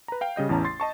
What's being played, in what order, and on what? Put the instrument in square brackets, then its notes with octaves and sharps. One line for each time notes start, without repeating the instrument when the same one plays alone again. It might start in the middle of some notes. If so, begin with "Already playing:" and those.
[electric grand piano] B4 A#5
F5 G5
C#3 G3 D#5 G6
A1 E2 E3 C#4 A5 A#5
C6 A6 C7
D#5 A5 C#6